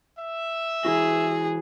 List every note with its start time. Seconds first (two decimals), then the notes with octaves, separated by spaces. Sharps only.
0.18 E5
0.85 E3 E4 F#4 G#4